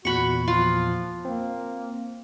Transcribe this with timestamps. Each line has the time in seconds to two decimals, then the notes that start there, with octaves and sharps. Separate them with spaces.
0.05 E2 A#2 F#4 B5 C#6 F#6
0.48 F3 F4
1.25 A#3 C4